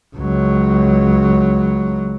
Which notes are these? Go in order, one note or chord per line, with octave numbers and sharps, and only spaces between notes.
C#2 F#3